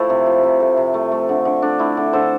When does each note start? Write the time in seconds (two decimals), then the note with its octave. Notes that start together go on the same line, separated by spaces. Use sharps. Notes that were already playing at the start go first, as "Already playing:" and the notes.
Already playing: F3 A3 E4
0.10 C3
0.26 F3
0.44 C3
0.60 A3
0.77 C3
0.94 A3
1.12 A3
1.29 D3
1.45 D3
1.62 A3 D4
1.79 A3 E4
1.97 D3
2.13 D3 A4 C5